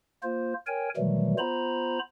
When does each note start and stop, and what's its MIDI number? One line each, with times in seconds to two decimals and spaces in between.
0.23 0.54 58
0.23 0.54 65
0.23 0.54 72
0.67 0.89 70
0.67 0.89 73
0.67 0.89 79
0.67 0.89 80
0.97 1.35 47
0.97 1.35 51
0.97 1.35 52
0.97 1.35 54
0.97 1.35 55
0.97 1.35 57
1.38 1.99 59
1.38 1.99 65
1.38 1.99 72
1.38 1.99 82
1.38 1.99 83